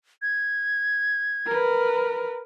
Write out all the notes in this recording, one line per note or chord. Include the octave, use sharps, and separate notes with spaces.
G#6
A#4 B4